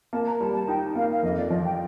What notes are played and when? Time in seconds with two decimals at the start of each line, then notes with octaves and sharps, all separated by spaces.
0.13 A#3 A5
0.26 A#5
0.40 G3 A5
0.54 A5
0.68 D#4 G5
0.95 A#3 F5
1.12 F5
1.23 F2 D#5
1.37 D5
1.50 F3 D#5
1.65 G5